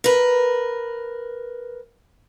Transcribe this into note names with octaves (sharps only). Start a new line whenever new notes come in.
A#4 B4